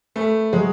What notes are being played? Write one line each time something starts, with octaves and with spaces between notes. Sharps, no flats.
A3 B4
F#3 G#3